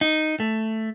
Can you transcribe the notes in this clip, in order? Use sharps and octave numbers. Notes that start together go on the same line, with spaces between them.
D#4
A3